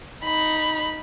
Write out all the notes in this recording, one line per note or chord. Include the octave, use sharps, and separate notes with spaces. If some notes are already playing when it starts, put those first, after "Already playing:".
D#4 B5